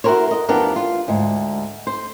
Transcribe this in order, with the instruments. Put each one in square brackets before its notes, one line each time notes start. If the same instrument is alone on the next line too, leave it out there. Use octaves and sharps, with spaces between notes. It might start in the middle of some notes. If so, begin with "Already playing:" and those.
[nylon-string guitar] E4 F#4 G4 A#4 C5 C#5
A#4 D#5
E2 F3 B3 D4 G4 A#4
F4
D2 G#2
C5